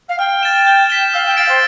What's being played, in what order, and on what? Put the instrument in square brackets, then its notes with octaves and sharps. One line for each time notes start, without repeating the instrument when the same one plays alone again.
[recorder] F5
[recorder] G5 [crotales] F6
[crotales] A6 E7
G6
B6 E7 G7
[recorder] F5 [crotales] E6
[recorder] G5
[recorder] F5 [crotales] A6 D7
[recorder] C5